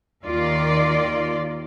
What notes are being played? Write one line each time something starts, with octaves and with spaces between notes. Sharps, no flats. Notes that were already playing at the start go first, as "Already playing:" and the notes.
D#2 D#3 F4 D5